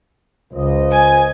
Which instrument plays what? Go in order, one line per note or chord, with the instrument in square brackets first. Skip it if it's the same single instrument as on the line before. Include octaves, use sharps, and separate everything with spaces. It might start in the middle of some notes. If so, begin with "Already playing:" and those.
[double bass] C#2 [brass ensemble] F4 C5 D#5
[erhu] G#5